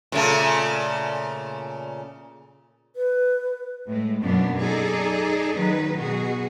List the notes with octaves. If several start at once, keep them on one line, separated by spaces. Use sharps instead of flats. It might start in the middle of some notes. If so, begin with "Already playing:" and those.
A#2 C#3 A3
B4
A2 G#3 A3
F#2 B2 F#3 A#3 B3 D4
D#4 G#4 A4 D5
D#3 F#3 D#4 B4
B2 F#4 G#4